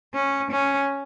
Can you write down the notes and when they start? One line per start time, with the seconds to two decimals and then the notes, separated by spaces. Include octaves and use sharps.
0.14 C#4
0.52 C#4